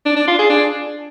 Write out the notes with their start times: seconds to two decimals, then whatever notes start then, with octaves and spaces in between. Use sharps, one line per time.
0.06 D4
0.17 D4
0.28 F4
0.39 G#4
0.50 D4